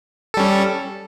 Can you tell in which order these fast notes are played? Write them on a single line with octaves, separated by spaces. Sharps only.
A4 G3 C#4